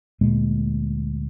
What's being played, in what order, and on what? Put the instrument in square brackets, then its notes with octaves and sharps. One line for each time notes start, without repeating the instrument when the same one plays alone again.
[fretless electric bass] D2 A#2 G#3 A#3